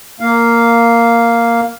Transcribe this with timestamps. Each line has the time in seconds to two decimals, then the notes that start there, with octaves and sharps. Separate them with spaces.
0.20 A#3 F5